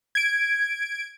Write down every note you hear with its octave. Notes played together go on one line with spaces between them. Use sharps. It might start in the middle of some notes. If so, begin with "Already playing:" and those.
G#6 D7